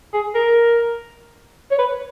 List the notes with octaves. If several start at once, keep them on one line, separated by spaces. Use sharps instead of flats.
G#4
A#4
C#5
B4